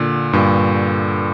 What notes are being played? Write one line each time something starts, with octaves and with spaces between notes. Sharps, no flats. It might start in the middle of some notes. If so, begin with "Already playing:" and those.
Already playing: A#2 D3
G2 A#2